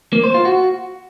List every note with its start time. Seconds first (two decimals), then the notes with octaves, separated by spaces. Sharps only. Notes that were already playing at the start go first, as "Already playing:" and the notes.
0.13 A#3
0.24 C5
0.34 F4
0.45 F#4